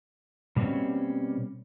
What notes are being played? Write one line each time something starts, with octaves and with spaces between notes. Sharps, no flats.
B2 G3 A#3 C4 C#4